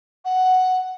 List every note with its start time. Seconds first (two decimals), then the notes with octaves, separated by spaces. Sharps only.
0.25 F#5